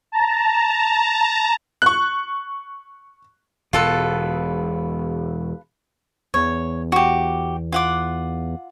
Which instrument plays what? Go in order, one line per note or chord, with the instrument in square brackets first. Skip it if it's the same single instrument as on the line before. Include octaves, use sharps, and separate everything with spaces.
[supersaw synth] A5 A#5
[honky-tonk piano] C#6 F#6
[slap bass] E1 B2 [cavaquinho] F4 A4 B4
[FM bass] E2 [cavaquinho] C#5
[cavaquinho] F#4 G4
F4 F#5 D6